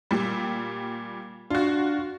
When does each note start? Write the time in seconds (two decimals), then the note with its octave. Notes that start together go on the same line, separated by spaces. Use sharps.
0.11 A#2 G3
1.50 D4 F4 F#4